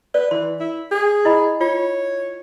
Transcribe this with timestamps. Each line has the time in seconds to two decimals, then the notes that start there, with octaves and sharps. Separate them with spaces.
0.14 B4 D5
0.31 E3 C6
0.60 E4
0.91 G#4
1.25 E4 D#5 B5
1.61 F4 C#5